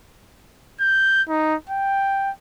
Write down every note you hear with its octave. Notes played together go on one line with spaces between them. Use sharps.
G6
D#4
G5